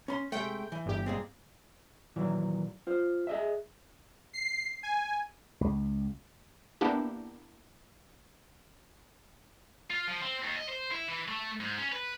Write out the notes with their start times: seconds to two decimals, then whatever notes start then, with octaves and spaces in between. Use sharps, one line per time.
0.08 C#4 B5 C6
0.32 C3 G#3 A3 G5
0.72 E3
0.86 G1 G4
1.06 A#2 G#3 C4
2.16 A#2 D#3 E3 F#3
2.87 F4 C5
3.27 G#4 D#5 E5
4.33 C7
4.83 G#5
5.61 C#2
6.81 A#3 B3 D4 E4 G4
9.90 F4
10.07 F3
10.22 C4
10.43 D#2
10.56 D#5
10.68 C5
10.91 E4
11.08 E3
11.28 A3
11.60 G#2
11.78 C#4
11.92 B4